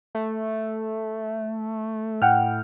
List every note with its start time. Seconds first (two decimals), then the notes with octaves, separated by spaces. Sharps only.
0.15 A3
2.22 A2 F#5 G5 F6